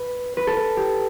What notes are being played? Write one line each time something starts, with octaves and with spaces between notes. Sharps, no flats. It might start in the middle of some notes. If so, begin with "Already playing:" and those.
Already playing: B4
B4
A4
B4
G4